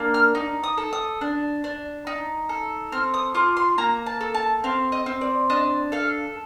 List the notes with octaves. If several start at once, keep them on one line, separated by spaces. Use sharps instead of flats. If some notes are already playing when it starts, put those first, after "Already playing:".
Already playing: A#3 D4
F6
D#4
D#6
A4
D#6
D4
D4
D#4
A4
C4 F6
D#6
F4 D6
C6
A#3 A#5
A5
A4
A5
C4 F5
D#5
C4
D5
D4 D#5
A4 F5